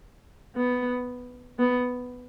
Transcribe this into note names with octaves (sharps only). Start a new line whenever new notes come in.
B3
B3